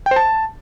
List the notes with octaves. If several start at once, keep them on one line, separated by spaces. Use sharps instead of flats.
G5
C5
A5